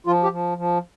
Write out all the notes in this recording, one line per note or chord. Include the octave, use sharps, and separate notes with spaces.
F3 F4
G4
F3
F3